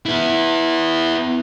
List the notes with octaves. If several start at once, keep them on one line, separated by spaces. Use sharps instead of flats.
B3 E4